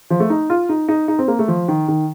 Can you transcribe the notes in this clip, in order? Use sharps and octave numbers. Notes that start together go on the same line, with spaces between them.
F3
A3
D#4
F4
D#4
D#4
D#4
C4
A#3
A3
F3
D#3
D#3